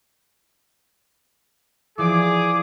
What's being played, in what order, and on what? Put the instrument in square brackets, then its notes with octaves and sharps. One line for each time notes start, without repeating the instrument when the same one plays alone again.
[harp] E3 F3 D5 [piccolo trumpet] G#4 [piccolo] D6